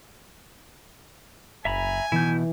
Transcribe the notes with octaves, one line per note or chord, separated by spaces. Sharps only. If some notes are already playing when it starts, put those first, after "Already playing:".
F#1 E5 G#5 A#5 B5
B2 E3 E4 G6